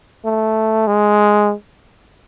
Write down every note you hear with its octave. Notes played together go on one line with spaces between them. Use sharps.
A3
G#3